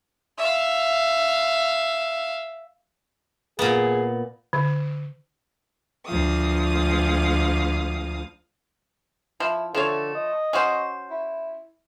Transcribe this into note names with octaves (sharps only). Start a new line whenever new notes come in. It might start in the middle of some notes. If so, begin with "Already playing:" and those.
E5 F5
A#2 B3 G#4
D3
D2 F3 F5 D#6
F3 E4
D3 F3 A3 C#5
D#5
C#4 F#4 C5
E4